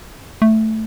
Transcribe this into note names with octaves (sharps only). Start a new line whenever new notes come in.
A3